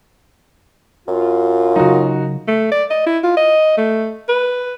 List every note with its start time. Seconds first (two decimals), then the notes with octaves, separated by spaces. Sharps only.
1.08 F#2 F4
1.76 C#3 F#3 D#4 F#4
2.48 A3
2.71 D5
2.90 D#5
3.06 E4
3.23 F4
3.37 D#5
3.77 A3
4.29 B4